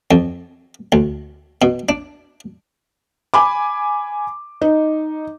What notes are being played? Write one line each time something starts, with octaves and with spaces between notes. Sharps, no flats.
F2
D2
B2
D4
G#5 B5 D6
D#4